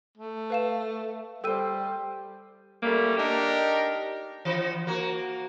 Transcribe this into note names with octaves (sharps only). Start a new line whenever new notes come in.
A3
B4 F5 E7
G3 A4 C5 G5 E6 D#7
G3 A3 A#3 C#4
D4 D#4 G4 A#4
E3
A#3 F#4